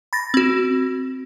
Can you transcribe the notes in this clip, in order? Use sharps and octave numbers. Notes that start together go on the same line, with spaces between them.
B5 A6 A#6
C4 F#4